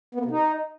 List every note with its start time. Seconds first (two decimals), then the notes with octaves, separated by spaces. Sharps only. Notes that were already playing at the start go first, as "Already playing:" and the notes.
0.15 B3
0.20 A#3
0.25 C3
0.31 D#4